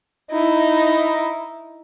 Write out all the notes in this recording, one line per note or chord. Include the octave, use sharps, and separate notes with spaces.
D#4 E4